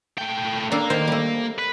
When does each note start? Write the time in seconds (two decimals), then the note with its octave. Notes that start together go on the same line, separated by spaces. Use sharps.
0.18 A2 G5
0.72 A#3 D4 A4
0.90 D#3 C5
1.08 G3 A3
1.58 B4